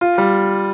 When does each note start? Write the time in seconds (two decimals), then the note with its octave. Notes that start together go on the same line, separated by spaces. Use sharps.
0.01 F4
0.18 G3